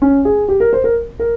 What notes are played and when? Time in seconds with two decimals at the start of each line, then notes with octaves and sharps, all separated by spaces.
0.02 C#4
0.25 G#4
0.48 G4
0.60 A#4
0.73 C5
0.84 A#4
1.19 A#4